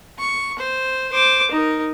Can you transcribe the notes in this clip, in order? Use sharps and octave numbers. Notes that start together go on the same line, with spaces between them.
C#6
C5
C5 D6
D#4 A#4